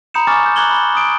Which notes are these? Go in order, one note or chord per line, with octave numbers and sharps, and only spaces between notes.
A#5 B5 D#6 G6 C#7 E7
G#5 C#6 D6 F6 A6
A#5 G6
A#5 D6 F#6 G#6 F#7 G7
B5 G7
D#6 D7